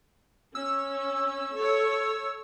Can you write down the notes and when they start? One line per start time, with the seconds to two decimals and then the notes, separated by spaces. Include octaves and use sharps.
0.55 C#4 E6
1.55 A4 C#5